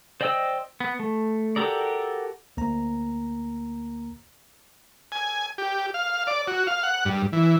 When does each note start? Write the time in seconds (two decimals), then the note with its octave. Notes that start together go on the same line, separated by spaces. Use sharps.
0.21 C5 D5 D#5 G5 E6
0.80 B3
1.00 A3
1.56 F#4 G4 A4 A#4 D5
2.57 D2 A#3 A#5
5.12 G#5
5.58 G4
5.94 F5
6.27 D5
6.48 F#4
6.67 F5
6.83 F#5
7.05 G2
7.33 E3